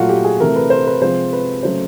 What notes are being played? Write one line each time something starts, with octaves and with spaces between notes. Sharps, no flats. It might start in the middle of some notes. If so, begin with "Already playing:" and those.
Already playing: A#2 F#3 A3 F4 F#4
G4
G#4
C3 E3 A3 A#4
B4
C5
B4
C3 F3 G#3 C5
B4
C#3 F#3 A3 C5